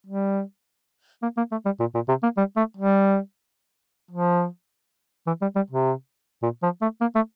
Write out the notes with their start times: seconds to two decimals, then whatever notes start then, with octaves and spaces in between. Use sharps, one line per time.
0.07 G3
1.22 A#3
1.37 A#3
1.52 A3
1.65 G3
1.80 A#2
1.95 A#2
2.08 C3
2.23 A#3
2.37 G3
2.57 A3
2.77 G3
4.11 F3
5.27 E3
5.42 G3
5.56 G3
5.71 C3
6.43 A#2
6.63 F3
6.81 A3
7.01 A#3
7.15 A3